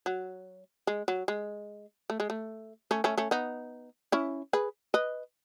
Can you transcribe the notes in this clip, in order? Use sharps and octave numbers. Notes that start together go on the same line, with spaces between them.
F#3
G#3
F#3
G#3
A3
G#3
A3
A3 C#4
A3 C#4
A3 C#4
B3 D#4
C#4 E4
G#4 B4
B4 D#5